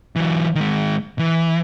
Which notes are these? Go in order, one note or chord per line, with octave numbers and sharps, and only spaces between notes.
E3 F#3
D#3 G#3
E3